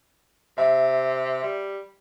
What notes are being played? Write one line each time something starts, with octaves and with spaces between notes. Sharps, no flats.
C3 E5
G3